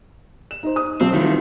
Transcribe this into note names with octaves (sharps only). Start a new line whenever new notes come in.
E7
D#4 C5
D#6
B1 C4
D#3 E3 G3 F4